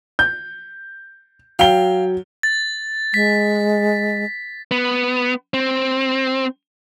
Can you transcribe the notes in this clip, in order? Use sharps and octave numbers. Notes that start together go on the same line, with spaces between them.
G6
F#3 F5 G5 G7
A6
G#3 B6
B3
C4